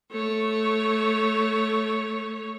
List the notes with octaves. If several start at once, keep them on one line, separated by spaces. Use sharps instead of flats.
A3 C#5